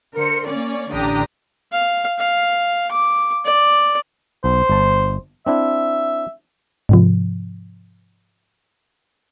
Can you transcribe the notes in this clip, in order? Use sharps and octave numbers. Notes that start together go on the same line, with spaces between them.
D3 A#4 C5 C#7
A#3 C#4 C#5 D5
A1 D3 D4 G4 A#5 D#6
F5
F5
D6
D5
B1 C5
G1 A5
C4 D4 E4 E5
G#2 C3 F3